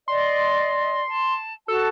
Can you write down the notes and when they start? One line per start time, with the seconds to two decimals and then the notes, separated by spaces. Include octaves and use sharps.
0.08 D5 D#5 C6
1.08 A5
1.68 F#4 A4 A5